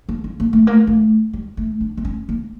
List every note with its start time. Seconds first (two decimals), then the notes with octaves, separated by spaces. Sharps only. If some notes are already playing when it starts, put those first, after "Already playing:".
0.09 A#3
0.24 C#4
0.40 A#3
0.53 A3
0.67 A#3
0.87 A3
1.33 G3
1.57 A3
1.81 D4
1.97 A#3
2.05 C#4
2.29 A#3